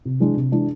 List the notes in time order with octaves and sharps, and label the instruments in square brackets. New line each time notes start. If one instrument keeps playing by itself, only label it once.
[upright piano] C3
E3 G#3 D4
C3
E3 G#3 D4